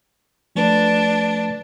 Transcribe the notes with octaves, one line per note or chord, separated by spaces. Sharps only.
F3 A3 D4 B4